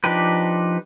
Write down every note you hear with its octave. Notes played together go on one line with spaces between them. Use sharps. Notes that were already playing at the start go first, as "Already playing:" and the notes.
F3 D4 D#4 G4 B4